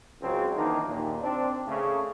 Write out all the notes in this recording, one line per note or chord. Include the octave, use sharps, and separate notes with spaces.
C#2 C#3 F#3 G#3 C4
D#3 E3 A#3 D4 D#4
D#2 A#2
C4 D4
C#3 A3